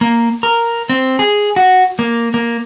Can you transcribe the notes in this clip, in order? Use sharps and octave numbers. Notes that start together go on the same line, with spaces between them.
A#3
A#4
C4
G#4
F#4
A#3
A#3